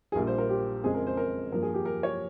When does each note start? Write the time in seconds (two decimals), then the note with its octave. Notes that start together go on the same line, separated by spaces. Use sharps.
0.12 G#4
0.15 A#1 A#2 G3 A#4
0.27 C5
0.38 A#4
0.50 G4
0.84 F2 C#3 G#3 C4 G#4
0.94 A#4
1.07 C5
1.17 A#4
1.52 G2 F3 A#3 A#4
1.62 G#4
1.74 G4
1.85 A#4
2.03 C#5